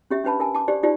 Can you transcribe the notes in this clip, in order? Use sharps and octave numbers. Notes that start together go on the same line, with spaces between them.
C#4 G4 E5
C#4 D4 B4 A5 B5
A#4 G#5 A5
A5 D6
G4 C5 D5
D#4 F4 G4 C5 D5